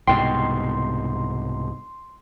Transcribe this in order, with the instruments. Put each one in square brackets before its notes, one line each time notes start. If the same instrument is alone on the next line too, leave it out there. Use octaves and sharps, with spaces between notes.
[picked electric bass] C2 G#2 B2 [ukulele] G5 [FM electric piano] C6